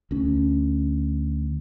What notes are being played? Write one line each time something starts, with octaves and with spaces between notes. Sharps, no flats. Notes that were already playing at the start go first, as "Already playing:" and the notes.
D2 C#4